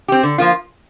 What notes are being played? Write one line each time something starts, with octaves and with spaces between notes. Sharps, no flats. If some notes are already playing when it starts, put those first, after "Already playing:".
C4 G4
D3
F3 A#3 F4